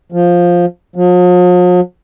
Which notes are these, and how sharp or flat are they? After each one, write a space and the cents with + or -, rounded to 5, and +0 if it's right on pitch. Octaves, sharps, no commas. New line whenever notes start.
F3 +5
F3 +45